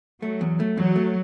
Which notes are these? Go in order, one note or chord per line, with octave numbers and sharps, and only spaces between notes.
F#3 A3
E2
A3
E2 F#3
A3